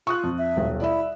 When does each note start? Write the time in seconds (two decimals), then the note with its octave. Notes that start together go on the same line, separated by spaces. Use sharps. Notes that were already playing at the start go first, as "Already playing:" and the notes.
0.07 F4 C#6 D#6 F#6
0.23 F2
0.38 E5
0.56 D#1 B1
0.80 E4 D5 E5